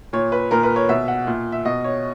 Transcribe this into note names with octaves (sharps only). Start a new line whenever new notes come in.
A#2 C#5
B4
A#2 A#4
B4
C#5
B2 E5
F#5
A#2
E5
B2 D#5
C#5